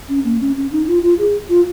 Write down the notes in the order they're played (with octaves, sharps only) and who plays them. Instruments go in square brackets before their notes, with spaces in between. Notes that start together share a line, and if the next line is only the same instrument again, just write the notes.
[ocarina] C#4
A#3
C#4
C#4
D#4
F4
F4
G#4
F4